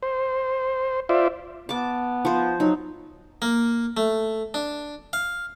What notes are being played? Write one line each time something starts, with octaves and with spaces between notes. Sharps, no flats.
C5
F4 C5 D5 E5
B3 A5 D6
F3 C5
F#3 D#4
A#3
A3
D4
F5